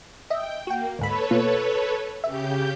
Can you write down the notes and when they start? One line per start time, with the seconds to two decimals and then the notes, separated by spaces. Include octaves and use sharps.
0.30 D#5 E5 G5
0.67 A#3 F#4 G5
0.99 D2 G#2 A4 B4 C#5 B5
1.31 B2 A#3 F4
2.24 C#3 G4 E5 G6